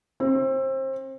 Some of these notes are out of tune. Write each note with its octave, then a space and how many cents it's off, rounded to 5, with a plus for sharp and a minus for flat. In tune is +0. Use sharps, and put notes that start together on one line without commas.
C4 +30